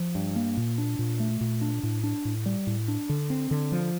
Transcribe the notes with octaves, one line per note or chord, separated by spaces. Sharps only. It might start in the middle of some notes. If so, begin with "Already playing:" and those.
Already playing: F3
G2
A#3
A#2
D4
A#2
A3
A#2
D4
A2
D4
A2
G3
A2
D4
D3
C4
D3
F3